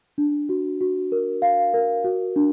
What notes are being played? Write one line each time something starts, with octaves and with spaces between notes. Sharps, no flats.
D4
F#4
F#4
A#4
F5
A#4
F#4
D4